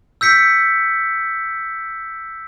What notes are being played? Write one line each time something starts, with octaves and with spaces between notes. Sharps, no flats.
E6 G6 B6 C#7